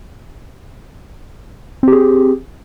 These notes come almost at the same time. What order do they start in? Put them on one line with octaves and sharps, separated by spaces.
C4 G4 G#4